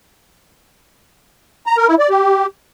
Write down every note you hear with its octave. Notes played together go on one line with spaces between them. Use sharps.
A#5
A#4
E4
D5
G4